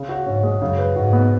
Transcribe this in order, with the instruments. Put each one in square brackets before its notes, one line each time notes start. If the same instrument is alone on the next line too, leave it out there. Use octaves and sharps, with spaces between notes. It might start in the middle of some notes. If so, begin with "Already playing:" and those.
Already playing: [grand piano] C#3
F#4
[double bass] G#2 [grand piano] C#4
[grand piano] G#3
[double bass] F#2 [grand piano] C#3
[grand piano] B4
[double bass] G#2 [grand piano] F#4
[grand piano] B3